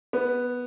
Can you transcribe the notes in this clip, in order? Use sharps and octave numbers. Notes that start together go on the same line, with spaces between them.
B3